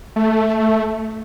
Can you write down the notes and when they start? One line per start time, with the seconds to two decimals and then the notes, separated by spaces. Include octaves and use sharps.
0.16 A3